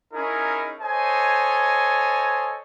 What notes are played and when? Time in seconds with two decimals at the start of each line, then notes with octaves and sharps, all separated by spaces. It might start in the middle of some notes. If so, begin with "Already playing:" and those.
0.14 C#4 D#4 E4 G#4 A#4
0.80 A4 C5 C#5 D#5 G#5